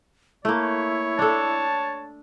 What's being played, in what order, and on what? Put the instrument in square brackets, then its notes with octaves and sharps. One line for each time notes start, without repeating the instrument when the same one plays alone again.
[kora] A3 A#3 [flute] E4 [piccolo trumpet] C#5
[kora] D4 A4 [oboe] A5